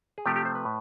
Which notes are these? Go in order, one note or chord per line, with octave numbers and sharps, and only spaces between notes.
G#4
C3 F3 A3 G4
G4
C5
B4
A2